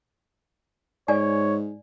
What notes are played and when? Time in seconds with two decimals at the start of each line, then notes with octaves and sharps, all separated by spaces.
1.08 G#2 C#5 D5 G#5